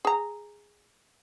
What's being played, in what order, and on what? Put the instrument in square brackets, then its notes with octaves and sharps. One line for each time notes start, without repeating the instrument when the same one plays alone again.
[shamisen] G#4 A#5